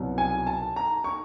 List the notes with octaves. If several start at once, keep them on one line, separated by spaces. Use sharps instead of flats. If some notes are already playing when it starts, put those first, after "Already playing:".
Already playing: C2 B2 F#3
G#5
A5
A#5
C#6